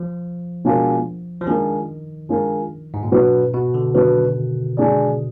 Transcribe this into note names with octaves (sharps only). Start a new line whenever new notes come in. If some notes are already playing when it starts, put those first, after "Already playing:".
Already playing: F3
B2 G#3 D4 F4 A#4
F3
D#3 G#3 D4 F4 A#4
G#3 D4 F4 A#4
G#2
A#2
B2 F#3 D4 F#4 B4
B2
D3
D#3 F#3 D4 F#4 B4
G#3 D4 G#4 D5